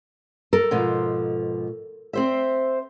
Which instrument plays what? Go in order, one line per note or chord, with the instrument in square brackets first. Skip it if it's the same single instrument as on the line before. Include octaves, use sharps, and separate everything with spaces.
[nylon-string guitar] A4 A#4
[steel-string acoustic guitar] G#2 B2 F3
C4 C5 E5